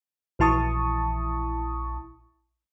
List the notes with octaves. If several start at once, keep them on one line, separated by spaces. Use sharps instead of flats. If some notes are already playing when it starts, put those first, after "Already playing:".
A#1 E3 E4 A5 C#6 D#6